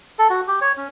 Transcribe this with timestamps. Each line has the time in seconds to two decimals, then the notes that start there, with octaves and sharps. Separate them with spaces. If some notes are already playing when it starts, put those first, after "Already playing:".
0.19 A4
0.30 F#4
0.48 G4
0.61 C#5
0.77 C#4